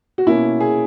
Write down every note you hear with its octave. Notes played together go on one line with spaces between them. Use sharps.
F#4
B2 A#3 C#4 E4
G#4